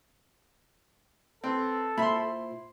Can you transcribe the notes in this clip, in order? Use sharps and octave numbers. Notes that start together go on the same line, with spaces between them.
C4 A4 B4
A#2 E4 C5 B5 C6